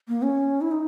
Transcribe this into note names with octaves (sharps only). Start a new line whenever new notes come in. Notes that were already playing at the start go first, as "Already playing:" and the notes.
A#3
C#4
E4
D#4